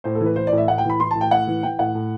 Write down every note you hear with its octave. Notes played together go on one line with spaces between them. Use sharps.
A2 C5
A4
E3
B4
E3 C5
D5
A2
E5
A2 F#5
G5
E3 B5
E3 C6
A2 A5
G5
A2 F#5
E3
E3 G5
A2 F#5
A2